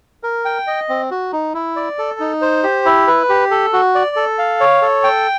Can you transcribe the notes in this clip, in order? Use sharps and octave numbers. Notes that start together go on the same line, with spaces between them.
A#4
G5
D#5
C4
F#4
D#4
E4
D5
A4
D#4
C5
G4
E4
B4
G4
A4
F#4
D5
A4
F5
C#5
A4
G5